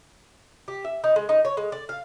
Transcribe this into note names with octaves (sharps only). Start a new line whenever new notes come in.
G4
E5
D#4
G#3
D#4
C#5
G#3
D5
F5